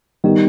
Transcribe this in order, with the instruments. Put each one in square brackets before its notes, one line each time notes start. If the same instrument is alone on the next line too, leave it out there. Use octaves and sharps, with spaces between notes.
[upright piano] D#3 [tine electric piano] G3 B3 G4